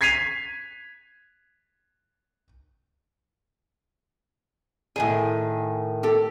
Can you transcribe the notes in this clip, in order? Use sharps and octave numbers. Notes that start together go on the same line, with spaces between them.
G#6 B6 C7 D#7 F7
A2 D#3 G#4 G#5
G4 A4